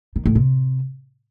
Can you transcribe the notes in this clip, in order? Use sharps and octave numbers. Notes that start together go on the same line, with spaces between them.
D#3
A2
C3